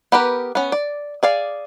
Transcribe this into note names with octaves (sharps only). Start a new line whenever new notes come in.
B3 G4 A#4 B4
B3 C#4
D5
G#4 D5 F5